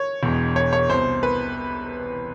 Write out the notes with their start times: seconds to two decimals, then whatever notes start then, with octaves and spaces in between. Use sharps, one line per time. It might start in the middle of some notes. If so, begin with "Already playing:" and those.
Already playing: C#5
0.23 E1 E2 B2
0.56 C#5
0.73 C#5
0.89 C2 B2 C5
1.23 B4